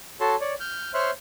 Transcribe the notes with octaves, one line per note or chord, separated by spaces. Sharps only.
F#4 A4 C#5 A5 C6
C#5 D5
F6 G6
C5 C#5 E5 C6 F6 F#6